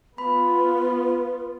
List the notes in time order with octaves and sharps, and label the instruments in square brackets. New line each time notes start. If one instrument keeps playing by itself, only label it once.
[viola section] B3 F4 [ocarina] B4 [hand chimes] B5